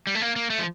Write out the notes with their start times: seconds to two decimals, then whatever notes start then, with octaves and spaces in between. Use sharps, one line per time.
0.07 G3
0.15 A3
0.22 A#3
0.36 A#3
0.50 A3
0.59 F3